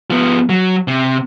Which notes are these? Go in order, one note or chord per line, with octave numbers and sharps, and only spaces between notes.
F3 B3
F#3
C3